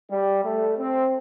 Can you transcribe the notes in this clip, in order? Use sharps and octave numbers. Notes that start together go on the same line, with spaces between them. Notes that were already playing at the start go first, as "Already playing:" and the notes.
G3
A3
C4